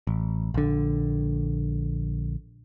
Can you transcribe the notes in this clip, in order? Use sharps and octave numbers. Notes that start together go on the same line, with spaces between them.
A1
A#1 D3